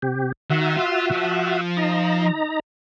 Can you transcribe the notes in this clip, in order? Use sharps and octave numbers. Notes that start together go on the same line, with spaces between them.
C3 G4
D#3 F#4 E5
F4
F3
D#4 A#5